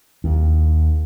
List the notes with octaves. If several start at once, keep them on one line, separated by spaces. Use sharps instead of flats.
D#2